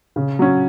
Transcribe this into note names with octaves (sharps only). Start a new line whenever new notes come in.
C#3
F#3 C#4